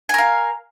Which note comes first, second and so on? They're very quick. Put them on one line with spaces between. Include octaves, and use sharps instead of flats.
G#5 A#4 F5